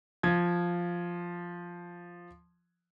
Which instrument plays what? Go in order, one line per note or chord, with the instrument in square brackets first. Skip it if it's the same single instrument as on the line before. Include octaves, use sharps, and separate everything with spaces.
[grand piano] F3 G#6